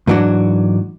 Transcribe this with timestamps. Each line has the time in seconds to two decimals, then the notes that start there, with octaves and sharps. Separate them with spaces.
0.07 G#2 E3 F#3 D4 F#4